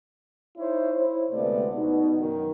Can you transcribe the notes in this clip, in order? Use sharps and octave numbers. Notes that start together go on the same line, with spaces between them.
D#4 E4 C5 C#5
E4 C5
D2 C3 G#3 A3 B3 D5
B2 D#4
F#2 D#3